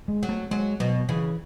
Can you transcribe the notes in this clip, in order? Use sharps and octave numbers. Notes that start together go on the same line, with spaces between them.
G#3
F#3
A3
F#3 G#3
B2 F#3
C#3 E3